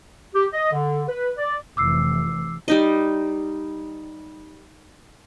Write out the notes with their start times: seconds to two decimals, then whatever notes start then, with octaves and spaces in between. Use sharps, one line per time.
0.35 G4
0.53 D#5
0.72 D3
1.09 B4
1.38 D5
1.77 F1 E3 D6 E6 C7
2.68 G3 D#4 D#5